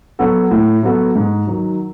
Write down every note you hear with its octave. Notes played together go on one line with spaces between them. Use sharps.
F#3 B3 F#4 A4
A2
F#3 B3 F#4 A4
G#2
D#3 F#3